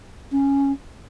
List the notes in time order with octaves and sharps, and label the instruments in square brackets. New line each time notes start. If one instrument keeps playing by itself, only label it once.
[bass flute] C#4